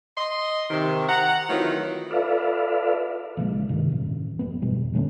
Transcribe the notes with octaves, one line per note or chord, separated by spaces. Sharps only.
D#5 C6
C3 D#3
F#5 A#5
D#3 E3 F#3 A3 C4 F4
F4 A4 B4 D5 E5 F5
A#1 C#3 E3 G#3
G2 C3 D#3
D#1 A1
F#1 B3
G1 E2 B2 G3
A#2 D3 A3 C#4